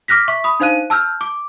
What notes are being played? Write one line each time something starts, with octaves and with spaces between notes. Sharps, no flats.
D6 F6 F#6 A#6 B6
E5 C#6 B6
B5 D#6
D4 D#4 C5 F5 F#6 D#7
A5 E6 F6 G6
D6